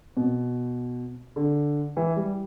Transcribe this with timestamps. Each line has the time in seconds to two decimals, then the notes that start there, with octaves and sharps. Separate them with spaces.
0.17 B2
1.36 D3
1.97 E3
2.16 G3